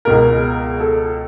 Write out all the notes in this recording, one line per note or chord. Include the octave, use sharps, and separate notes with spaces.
C#2 B2 G#3 A#4
A4